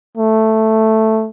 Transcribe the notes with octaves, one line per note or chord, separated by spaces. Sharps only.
A3